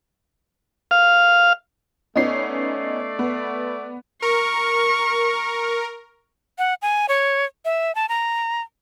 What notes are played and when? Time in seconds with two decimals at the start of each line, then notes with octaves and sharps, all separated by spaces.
0.91 F5
2.16 A3 B3 C#4 D#4 D5 D#5 C7
3.19 B3
4.22 A#4 C#6
6.58 F#5
6.82 G#5
7.09 C#5
7.65 E5
7.95 A5
8.09 A#5